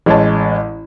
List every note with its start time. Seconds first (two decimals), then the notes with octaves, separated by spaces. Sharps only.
0.06 A1 G#3 C#5 A5